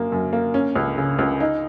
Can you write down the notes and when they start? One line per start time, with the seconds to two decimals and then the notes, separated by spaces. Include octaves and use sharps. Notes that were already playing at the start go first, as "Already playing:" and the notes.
Already playing: F#2 A#3
0.12 F#2
0.33 A#3
0.54 C#4
0.76 C#2
0.98 C#3
1.19 C#2
1.40 D#4